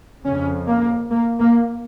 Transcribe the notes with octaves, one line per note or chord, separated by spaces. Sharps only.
F2 C#3 C#4
A#3
A#3
A#3